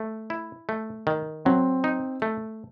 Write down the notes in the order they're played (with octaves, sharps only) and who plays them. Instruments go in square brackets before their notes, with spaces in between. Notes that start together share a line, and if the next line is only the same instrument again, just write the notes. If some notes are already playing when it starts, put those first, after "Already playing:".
Already playing: [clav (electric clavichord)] A3
E4
A3
D#3
[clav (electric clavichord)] F#3 [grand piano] C4
[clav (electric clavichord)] D#4
A3